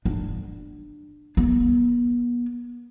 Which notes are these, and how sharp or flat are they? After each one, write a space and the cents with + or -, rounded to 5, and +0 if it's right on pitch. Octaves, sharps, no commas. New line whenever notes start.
D4 +20
B3 -40